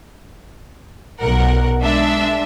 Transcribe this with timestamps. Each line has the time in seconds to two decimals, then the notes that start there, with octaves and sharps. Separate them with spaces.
1.19 B1 A#4 F#5
1.82 G#3 D4 E5